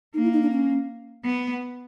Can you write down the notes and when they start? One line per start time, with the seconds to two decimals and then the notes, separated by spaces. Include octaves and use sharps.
0.14 A#3 D#4
0.24 E4
0.32 D#4
0.42 D4
0.51 C#4
1.25 B3